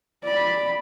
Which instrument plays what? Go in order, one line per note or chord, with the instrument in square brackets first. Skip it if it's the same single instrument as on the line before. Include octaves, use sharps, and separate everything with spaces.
[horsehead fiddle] D5 B5